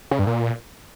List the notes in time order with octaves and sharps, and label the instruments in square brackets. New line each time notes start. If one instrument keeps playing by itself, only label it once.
[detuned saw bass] C#3
G2
A#2